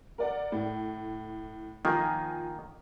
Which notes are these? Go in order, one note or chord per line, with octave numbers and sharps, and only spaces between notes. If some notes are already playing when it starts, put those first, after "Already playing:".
A#4 D5 F#5
A2
D#3 F3 A#3 G#5